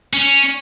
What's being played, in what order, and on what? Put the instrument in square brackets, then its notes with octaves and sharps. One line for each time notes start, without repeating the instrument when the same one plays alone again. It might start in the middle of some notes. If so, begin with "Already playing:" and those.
[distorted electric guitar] C#4